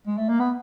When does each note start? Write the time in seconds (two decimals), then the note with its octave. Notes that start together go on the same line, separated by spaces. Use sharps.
0.07 G#3
0.18 A3
0.29 A#3
0.40 B3